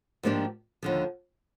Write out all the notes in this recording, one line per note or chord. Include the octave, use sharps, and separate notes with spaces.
G#2 F3 A#3 D4 G4
D#2 D3 F3